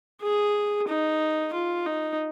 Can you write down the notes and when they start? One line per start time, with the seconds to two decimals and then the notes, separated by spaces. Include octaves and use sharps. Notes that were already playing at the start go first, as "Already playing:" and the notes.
0.22 G#4
0.88 D#4
1.53 F4
1.86 D#4